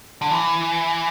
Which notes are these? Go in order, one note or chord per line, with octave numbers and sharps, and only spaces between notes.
D3
E3